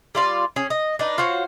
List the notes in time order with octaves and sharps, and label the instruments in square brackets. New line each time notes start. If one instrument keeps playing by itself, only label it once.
[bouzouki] G3 F4 D5
C#4 G#4
D#5
D4 D#4 B4
F4 F#4 C5 C#5